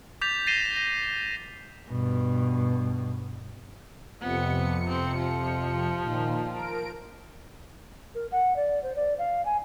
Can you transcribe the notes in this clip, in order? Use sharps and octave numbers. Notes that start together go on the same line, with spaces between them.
D6 G6 A6 B6 F7
A6 A#6 C7 D#7 E7 G7
A#6
G2 B2
F2 C3 B3 C#7
C4
F3
A#2 D#3
A#4 D7
A#4
F#5
D5
C5
D5
F5
G#5